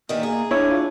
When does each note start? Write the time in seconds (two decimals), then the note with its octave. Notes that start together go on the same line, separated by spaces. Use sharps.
0.09 D#3 E3 G3 A#3
0.23 G#4
0.51 D4 E4 C#5
0.70 F4